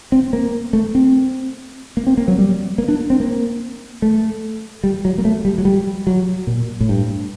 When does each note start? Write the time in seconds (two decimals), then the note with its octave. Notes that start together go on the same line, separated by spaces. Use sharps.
0.12 C4
0.33 A#3
0.73 A3
0.95 C4
1.97 A#3
2.07 C4
2.18 A#3
2.28 F#3
2.38 G3
2.78 A#3
2.88 D4
3.10 C4
3.20 A#3
4.02 A3
4.83 G3
5.05 F#3
5.18 A#3
5.25 A3
5.45 G3
5.58 F#3
5.65 G3
6.07 F#3
6.47 A#2
6.80 A2
6.89 G2